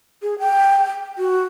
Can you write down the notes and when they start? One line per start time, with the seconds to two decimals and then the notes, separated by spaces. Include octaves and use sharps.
0.23 G#4
0.39 G5
1.18 F#4